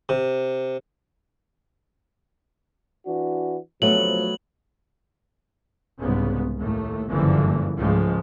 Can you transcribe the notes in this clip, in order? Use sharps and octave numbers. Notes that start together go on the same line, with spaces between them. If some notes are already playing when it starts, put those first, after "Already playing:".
C3
E3 D4 F#4
D2 C3 F3 F#3 A3 B3 F#7
C2 G#2 C#3 B3
D#2 A2 A3
F#1 G2 A#2 D3 E3 F3
C#2 G#2 F3 G#3 A3